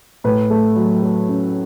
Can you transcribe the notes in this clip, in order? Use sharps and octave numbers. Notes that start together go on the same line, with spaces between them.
A2 B4
A3
F#3
A3
C#4